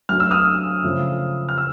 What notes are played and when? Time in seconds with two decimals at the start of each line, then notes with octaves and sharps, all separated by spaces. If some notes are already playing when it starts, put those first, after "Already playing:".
0.09 F#3 A3 D4 F6
0.20 E6
0.31 D#6 F6
0.84 C#3 F3 A3
1.49 F6
1.58 E6